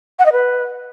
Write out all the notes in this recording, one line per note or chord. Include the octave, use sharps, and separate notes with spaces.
F#5
D#5
B4